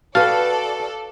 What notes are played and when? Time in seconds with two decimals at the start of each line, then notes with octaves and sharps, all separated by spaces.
0.15 F#4 A4 B4 D5 F5 G5 A5